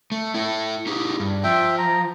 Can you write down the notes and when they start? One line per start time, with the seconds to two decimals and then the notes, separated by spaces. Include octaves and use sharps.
0.12 A3
0.34 E4 A4
0.87 D#4 G4 G#4
1.20 G2
1.44 F3 E5 G5
1.78 A#5